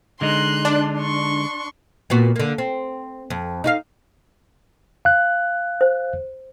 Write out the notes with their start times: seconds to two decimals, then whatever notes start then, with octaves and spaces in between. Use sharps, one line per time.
0.21 D3 G#3 D#4 C6 F#6
0.65 D4
0.98 C6 C#6
2.10 A#2 B3 F#4
2.36 D3 A#3
2.58 C4
3.30 F2
3.64 D#4 F#4 F5
5.05 F5 F#6
5.81 C5